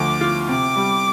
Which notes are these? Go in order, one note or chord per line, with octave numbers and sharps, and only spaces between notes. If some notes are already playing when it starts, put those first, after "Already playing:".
Already playing: D2 F3 D6
F4
C3 D6
G3